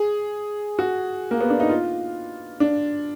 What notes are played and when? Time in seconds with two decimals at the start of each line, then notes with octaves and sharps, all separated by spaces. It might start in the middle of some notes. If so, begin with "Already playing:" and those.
Already playing: G#4
0.79 F#4
1.31 A#3
1.41 B3
1.50 D4
1.60 D#4
1.69 F4
2.60 D4